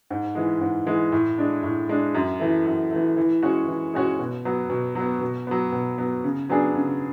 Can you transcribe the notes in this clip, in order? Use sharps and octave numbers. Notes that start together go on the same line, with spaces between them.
G#2
E3 G#3
G#2
E3 G#3
A2
G#3 D4
A2
G#3 D4
F#2
E3 A3
F#2
E3 A3
E3
G#3 C#4 F#4 C#5
E3
G#3 C#4 F#4 C#5
B2
F#3 B3
B2
F#3 B3
B2
F#3 B3
B2
F#3 B3
C#3
F#3 B3 D4 G#4
C#3